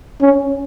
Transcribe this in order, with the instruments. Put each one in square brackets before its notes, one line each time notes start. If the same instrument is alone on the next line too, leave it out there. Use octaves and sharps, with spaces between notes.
[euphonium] C#4